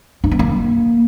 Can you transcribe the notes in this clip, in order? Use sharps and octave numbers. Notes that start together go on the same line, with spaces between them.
D4
B3
A#3